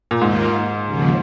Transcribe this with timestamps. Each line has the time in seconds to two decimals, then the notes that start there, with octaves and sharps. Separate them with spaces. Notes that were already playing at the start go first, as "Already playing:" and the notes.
0.11 A#2
0.21 D#2 G#2 D#3 A#3 F4
0.86 D#2 C#3 F3